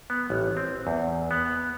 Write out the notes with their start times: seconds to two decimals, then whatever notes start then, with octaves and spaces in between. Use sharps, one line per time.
0.10 B3
0.30 A1
0.57 C4
0.87 E2
1.31 B3